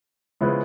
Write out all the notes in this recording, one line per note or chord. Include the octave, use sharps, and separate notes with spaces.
C#3 F3 G#3 B3 E4